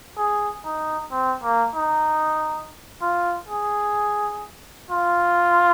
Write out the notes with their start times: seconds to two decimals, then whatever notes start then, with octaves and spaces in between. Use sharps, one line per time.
0.17 G#4
0.65 D#4
1.11 C4
1.43 A#3
1.75 D#4
3.02 F4
3.48 G#4
4.91 F4